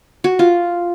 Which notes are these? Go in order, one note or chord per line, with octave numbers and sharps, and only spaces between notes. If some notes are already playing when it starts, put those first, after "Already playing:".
F#4
F4